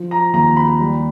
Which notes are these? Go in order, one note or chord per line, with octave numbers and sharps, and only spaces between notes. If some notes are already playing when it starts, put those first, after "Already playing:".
Already playing: F3
A#5
D#2 A#5
B5
G3